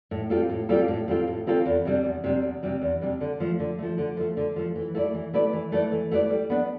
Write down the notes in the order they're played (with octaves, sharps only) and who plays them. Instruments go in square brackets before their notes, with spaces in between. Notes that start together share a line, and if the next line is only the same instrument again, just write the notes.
[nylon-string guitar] A2
G3 C4 F4 A4
A2
G3 C4 F4 A4
A2
G3 C4 F4 A4
A2
G3 C4 F4 A4
E2
C3 G3 D4
E2
C3 G3 D4
E2
C3 G3 D4
E2
C3 G3 D4
D3
F3 A3
D3
F3 A3
D3
F3 A3
D3
F3 A3
E3
A3 E4 B4 D5
E3
A3 E4 B4 D5
E3
A3 E4 B4 D5
E3
A3 E4 B4 D5
G3
B3 D4